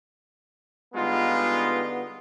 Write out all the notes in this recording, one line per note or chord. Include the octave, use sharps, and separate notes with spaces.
D3 G3 G#3 B3 D#4 F4